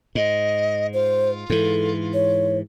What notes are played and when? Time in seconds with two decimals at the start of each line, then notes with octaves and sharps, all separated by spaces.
0.15 G#2 D#5
0.94 F4 C5
1.50 G#2 E3 A4
2.14 C#5